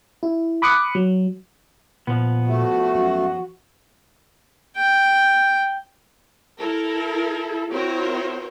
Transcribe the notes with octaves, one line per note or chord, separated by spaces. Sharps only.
E4
B5 D6 D#6 F#6 C#7
F#3
A#2 F3 B3
A3 F#4
F#2
G5
E4 A4 A#4
C4 E4 F#4 A#4 C5 C#5